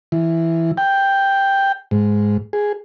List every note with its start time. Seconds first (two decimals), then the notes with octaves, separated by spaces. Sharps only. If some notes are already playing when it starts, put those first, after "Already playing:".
0.12 E3
0.77 G5
1.91 G#2
2.53 G#4